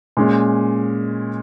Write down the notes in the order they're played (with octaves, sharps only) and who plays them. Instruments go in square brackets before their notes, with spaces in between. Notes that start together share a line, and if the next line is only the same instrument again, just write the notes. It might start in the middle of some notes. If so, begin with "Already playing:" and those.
[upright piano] A#2 G#3 C#4